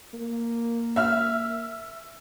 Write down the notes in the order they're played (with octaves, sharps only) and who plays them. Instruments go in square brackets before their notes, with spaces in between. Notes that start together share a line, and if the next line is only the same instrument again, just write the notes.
[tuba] A#3
[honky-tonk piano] E5 F6